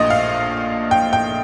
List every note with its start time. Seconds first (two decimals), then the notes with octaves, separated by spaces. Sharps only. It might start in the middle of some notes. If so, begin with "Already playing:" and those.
Already playing: A#1 A#2 A3 D4 D#5
0.10 F5
0.91 G5
1.13 G5